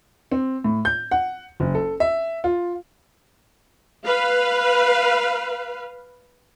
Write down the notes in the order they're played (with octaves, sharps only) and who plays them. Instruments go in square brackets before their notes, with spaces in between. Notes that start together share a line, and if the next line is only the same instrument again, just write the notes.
[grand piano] C4
A2
G6
F#5
F#1
A4
E5
F4
[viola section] B4 F5